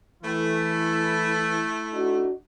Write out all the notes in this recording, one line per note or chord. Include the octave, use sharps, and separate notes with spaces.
E3 A3 E4
D4 D#4 F#4